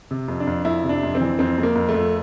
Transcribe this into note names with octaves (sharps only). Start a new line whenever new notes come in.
C3
F2
D4
F2
F2 E4
C3
D4
F2
C4
E3
F2 C4
F2
A#3
F2
A3
F2